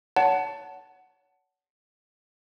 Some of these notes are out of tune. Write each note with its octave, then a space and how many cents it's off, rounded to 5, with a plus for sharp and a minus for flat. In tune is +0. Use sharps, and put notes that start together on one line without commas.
C#5 +30 F#5 +10 A5 +0